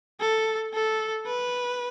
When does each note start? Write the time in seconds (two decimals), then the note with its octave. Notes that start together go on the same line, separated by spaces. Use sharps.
0.21 A4
0.74 A4
1.27 B4